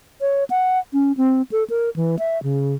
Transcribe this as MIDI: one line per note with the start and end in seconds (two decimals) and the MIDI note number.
0.21 0.44 73
0.50 0.79 78
0.93 1.12 61
1.17 1.42 60
1.52 1.64 69
1.70 1.90 70
1.96 2.16 52
2.19 2.41 76
2.43 2.75 49